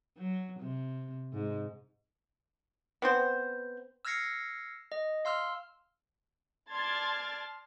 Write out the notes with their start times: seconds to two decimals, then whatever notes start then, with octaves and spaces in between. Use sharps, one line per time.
0.18 F#3
0.60 C3
1.33 G#2
3.02 B3 C4 C5
4.05 E6 F6 G#6 A#6 C7 C#7
4.92 D#5
5.25 F5 C6 E6 F6
6.72 D5 A5 C6 F6 G#6 A6